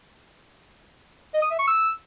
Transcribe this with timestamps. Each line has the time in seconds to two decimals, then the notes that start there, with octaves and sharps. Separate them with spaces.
1.34 D#5
1.42 D#6
1.51 E5
1.59 C#6
1.67 E6